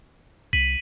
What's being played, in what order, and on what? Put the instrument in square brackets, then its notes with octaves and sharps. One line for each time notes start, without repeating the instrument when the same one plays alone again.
[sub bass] C2 [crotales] B6 D#7 F#7